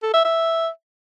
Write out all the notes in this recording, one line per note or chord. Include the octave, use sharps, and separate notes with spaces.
A4
E5
E5